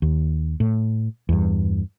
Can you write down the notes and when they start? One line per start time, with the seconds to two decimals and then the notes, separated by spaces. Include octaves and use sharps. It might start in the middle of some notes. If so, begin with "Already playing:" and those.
0.02 D#2
0.60 A2
1.29 E2 G2